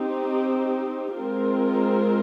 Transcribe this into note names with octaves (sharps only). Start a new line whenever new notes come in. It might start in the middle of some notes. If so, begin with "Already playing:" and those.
Already playing: C4 D#4 G4
G#3 C4 F4 A#4